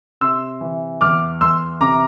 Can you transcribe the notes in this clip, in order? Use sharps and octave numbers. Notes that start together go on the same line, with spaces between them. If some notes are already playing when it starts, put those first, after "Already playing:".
C3 C6 E6
E3
E2 D6 F6
E2 C6 E6
C3 A#5 D6